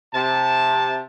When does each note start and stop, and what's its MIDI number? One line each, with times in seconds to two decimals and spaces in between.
0.14 1.04 48
0.14 1.04 81